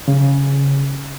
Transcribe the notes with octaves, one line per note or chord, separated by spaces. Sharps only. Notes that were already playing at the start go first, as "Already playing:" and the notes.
C#3